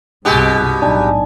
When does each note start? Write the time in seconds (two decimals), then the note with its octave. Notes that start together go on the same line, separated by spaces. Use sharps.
0.25 C2 G2 B2 G#3 G4
0.82 B1 A2 D4 D#4 G#5